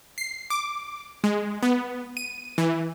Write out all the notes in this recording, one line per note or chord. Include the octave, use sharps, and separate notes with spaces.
C7
D6
G#3
B3
D#7
E3